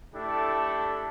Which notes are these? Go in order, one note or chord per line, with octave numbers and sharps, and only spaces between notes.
A3 D4 E4 G4 A4